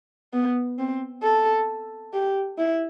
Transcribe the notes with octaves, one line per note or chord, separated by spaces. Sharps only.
B3
C4
A4
G4
E4